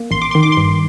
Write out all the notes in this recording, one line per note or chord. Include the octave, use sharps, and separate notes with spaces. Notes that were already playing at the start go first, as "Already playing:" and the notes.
Already playing: A#3
A1 C6
D6
D#3 C6
D6
G2 C6